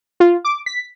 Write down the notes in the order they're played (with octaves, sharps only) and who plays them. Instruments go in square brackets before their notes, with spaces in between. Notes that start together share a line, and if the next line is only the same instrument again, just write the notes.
[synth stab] F4
D6
B6